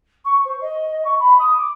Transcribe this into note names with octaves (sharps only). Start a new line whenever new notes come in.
C#6
C5
D#5
C#6
B5
D#6
D6